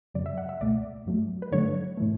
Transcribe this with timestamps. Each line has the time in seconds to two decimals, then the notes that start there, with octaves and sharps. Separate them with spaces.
0.14 F#2 C#3 F#3 D5
0.26 E5
0.38 F#5
0.49 E5
0.61 C#2 B2 A3 D5
1.06 G2 F#3 A3
1.42 B4
1.52 G2 D3 F#3 A3 C#5
1.97 A2 E3 A3